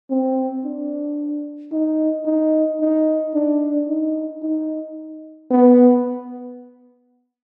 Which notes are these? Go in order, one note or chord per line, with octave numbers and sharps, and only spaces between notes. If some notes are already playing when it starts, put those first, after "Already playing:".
C4
D4
D#4
D#4
D#4
D4
D#4
D#4
B3